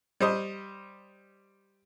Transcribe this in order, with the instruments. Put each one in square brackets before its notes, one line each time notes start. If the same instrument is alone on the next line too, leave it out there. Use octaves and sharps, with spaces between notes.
[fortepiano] G3 C5 D#5